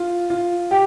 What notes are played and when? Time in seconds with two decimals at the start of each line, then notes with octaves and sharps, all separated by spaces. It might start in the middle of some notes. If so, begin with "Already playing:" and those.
Already playing: F4
0.30 F4
0.71 G4